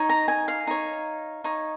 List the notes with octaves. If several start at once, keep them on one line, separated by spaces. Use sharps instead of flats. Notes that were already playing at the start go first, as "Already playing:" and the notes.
Already playing: D#4 C#5
A#5
G#5
F5
D#4 C#5
D#4 C#5